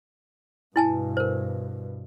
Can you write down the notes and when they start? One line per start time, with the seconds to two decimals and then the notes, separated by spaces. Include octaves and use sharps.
0.76 G2 B2 E4 G#5 A5
1.17 A#4 C5